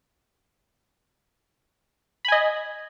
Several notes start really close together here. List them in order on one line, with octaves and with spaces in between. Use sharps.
B5 G#5 D#5